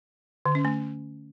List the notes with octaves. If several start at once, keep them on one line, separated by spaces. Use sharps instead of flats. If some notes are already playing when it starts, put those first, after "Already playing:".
D3
C#4
A3